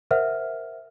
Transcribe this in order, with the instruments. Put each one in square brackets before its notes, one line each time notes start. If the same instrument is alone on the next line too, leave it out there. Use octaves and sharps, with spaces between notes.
[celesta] A#4 C5 E5 F#5 F6